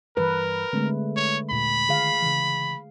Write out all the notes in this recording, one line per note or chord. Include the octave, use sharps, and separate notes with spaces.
G2 E3 A#4 B4
D3 G#3 A3 C4
C#5
D#2 A#2 B5
D3 D#3 G#4 F5
C#3 E3